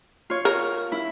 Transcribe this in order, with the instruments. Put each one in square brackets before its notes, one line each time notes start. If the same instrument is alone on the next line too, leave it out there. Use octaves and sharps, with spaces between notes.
[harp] F4 C#5
[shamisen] A#4
[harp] E4